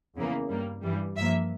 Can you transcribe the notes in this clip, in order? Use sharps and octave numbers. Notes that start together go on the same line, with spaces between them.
E2 C#3 E3 A#3
G2 G3 A#3
G2 E3 G3
G2 F3 A#3 E5